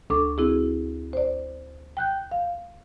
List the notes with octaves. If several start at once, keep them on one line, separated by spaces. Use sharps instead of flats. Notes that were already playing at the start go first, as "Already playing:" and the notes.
D2 D4 A4 C#6 D6
C4 E4 F#4 G#4
C5 D5
G5 F#6 G6
F5